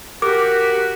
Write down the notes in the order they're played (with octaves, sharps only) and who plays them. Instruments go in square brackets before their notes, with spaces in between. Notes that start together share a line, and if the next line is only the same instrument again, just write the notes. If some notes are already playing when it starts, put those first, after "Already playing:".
[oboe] F#4 [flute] G4 [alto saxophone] A#4 [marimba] D6